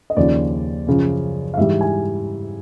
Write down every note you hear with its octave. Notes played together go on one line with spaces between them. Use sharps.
D#5
D#2 C#3 F3 D5
F#2 C#3 F3
F5
G#2 E3 G3 E5
G#5